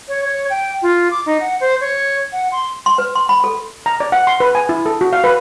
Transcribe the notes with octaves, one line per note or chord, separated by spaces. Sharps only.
C#5
C#5
G5
F4
D6
D#4
F#5
C5
C#5
F#5
C6
C6
B4
C6
B5
A4
A#5
D5
F#5
C6
B4
G#5
E4
A4
F#4
F5
B4